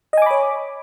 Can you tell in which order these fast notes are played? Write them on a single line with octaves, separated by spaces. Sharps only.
D#5 G#5 D6 B5 C#5